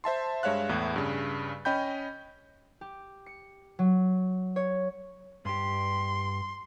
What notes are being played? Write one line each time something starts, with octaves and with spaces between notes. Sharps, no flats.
C5 E5 A5 C6
G2 G#3 C#5 E5 F5 F#6
E2 A2 E4
G2 C#3
C#4 D#5 G5 B5 G6
G4
C#7
F#3
C#5
G2 G4 C6